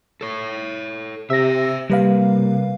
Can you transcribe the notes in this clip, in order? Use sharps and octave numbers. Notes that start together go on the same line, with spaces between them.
A4 C#5
C3 C5 E5 E6 A#6
C3 G3 A#3 B4 F5